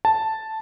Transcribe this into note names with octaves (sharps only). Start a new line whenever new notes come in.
A5